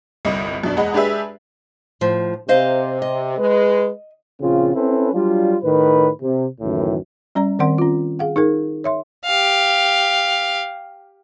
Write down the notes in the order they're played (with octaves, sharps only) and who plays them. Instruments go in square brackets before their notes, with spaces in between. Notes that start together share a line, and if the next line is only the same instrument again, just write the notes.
[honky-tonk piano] G1 C2 G2 D#5
F#2 B2 D4
E2 G#3 D#5 F#5 B5
G#3 D4 G4 G#4 B4 E5
[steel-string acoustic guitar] A2 F3
[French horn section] C3 [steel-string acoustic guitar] C5 D#5 F5
[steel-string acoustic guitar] D#5
[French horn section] G#3 B4
[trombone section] A#1 C#3 C4 F4
C4 C#4 E4 A4 B4
F#3 G3 D4 F4
A2 D#3 B4
C3
C#2 F#2 A2 D#3 E3
[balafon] G3 C#4 D5 A#5
D#3 C4 A#4 D5 F#5 C6
C#4 F4
G#4 F5 F#5
D#4 G#4 A#4
C#5 E5 C6
[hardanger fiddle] G4 F5